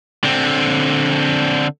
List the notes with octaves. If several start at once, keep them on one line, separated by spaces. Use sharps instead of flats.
D3 C4